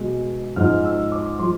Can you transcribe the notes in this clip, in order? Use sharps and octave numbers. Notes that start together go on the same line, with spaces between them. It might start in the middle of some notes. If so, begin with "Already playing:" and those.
Already playing: B2 G#3
G#2 F3 G#3 F6
E6
D6
F3 G#3 C6